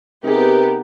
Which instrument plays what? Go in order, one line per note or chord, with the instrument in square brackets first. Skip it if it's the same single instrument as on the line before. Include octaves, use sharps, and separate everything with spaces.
[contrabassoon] C3 [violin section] B3 G4 [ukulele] D#4 G#4 [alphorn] A#4